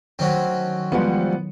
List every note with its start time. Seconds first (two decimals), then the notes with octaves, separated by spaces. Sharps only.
0.19 D#3 F#3 A3 C4 C#4 F#4
0.92 F3 G3 G#3 B3 F#5